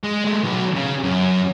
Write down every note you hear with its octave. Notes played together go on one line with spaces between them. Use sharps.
G#3
G#3 A3
B2 F#3
C#3
F#2